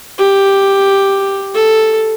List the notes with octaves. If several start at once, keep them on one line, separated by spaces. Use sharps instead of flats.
G4
A4